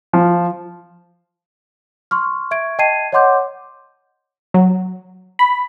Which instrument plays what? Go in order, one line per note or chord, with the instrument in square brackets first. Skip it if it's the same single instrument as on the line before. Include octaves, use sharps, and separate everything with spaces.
[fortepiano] F3
[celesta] C6 C#6 F6
E5 C#6 G#6 D7
D#5 G5 A5 G#6 C7 D#7
C#5 D#5 F#5 C6 D6 G6
[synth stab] F#3
B5